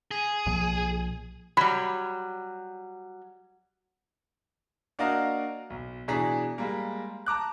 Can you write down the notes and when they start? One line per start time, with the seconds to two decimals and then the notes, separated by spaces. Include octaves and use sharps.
0.11 G#4
0.46 B1 A#2 F3
1.57 F#3 G3 B5
4.99 A#3 D4 F#4 A#4 D#5 F5
5.70 B1
6.08 B2 E3 D4 G#4 A#5 B6
6.58 G3 G#3 A#3
7.26 A5 A#5 D6 F#6